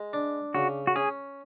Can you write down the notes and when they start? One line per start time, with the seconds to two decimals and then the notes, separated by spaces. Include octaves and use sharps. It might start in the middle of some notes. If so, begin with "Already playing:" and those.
Already playing: G#3
0.13 D4
0.54 C#3 F#4
0.87 F#4
0.96 C#4 G#4